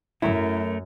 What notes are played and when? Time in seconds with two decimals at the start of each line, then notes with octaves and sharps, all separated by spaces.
0.22 F#2 F#3 A3 E4 A#4